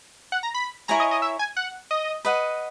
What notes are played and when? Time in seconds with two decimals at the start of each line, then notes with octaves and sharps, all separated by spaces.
0.32 F#5
0.43 A#5
0.54 B5
0.88 E4 A#4 C#5 G#5 A#5
1.00 D#5
1.11 D#5
1.22 E5
1.39 G#5
1.57 F#5
1.91 D#5
2.25 B4 D#5 F#5